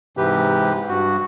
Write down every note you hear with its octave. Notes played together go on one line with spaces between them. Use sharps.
G#2 C3 E3 G4 B4
G2 F#4